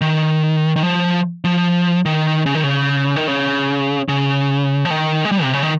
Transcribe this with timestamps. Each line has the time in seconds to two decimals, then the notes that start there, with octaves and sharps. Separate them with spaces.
0.01 D#3
0.76 D#3
0.83 F3
1.44 F3
2.06 D#3
2.46 C#3
2.55 D#3
2.64 C#3
3.16 D#3
3.28 C#3
4.08 C#3
4.85 F3
4.90 D#3
5.25 G#3
5.31 G3
5.43 C3
5.53 C#3
5.63 D#3